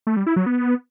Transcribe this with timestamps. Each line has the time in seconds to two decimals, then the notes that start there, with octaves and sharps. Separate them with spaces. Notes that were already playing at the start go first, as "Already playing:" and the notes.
0.07 A3
0.17 G3
0.26 E4
0.36 F#3
0.46 B3